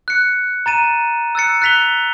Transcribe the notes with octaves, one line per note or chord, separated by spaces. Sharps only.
F#6 C#7
A#5 A6 D#7 E7
E6 F#6 A6 C#7
F#6 A6 B6 F7 G7